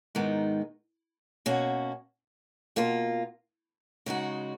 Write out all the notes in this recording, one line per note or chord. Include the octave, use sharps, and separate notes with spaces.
G#2 D#3 G#3 B3 D#4
B2 A#3 C#4 F#4
B2 A#3 F4
C#3 G#3 D#4 F#4